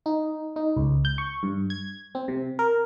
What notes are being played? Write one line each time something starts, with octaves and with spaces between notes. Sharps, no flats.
D#4
D#4
C#2
G6
C#6
G2
G#6
C4
C3
A#4